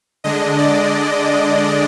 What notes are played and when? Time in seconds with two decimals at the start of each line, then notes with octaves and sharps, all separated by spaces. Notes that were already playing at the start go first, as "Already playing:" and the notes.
0.24 D3 G#3 D4 D#5
0.58 D5